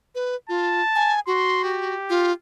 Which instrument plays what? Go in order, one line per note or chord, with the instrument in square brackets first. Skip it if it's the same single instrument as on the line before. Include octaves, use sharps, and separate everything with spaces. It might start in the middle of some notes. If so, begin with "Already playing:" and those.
[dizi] B4
[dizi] F4 [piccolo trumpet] A5
[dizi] G#5
[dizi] F#4 [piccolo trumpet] C6
[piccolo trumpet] G4
[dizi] F4